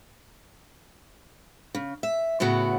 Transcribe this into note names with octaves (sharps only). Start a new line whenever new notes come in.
C#3
E5
A2 C#3 B3 F#4